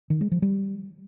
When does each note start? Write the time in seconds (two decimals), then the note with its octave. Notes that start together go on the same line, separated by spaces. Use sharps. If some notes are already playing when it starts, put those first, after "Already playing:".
0.10 D#3
0.21 G#3
0.32 F3
0.42 G3